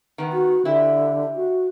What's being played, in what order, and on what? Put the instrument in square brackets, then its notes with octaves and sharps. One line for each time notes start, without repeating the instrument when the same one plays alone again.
[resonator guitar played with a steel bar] D#3 B3
[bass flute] F#4
[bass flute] D3 [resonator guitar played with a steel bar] E4 G4
[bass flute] F#4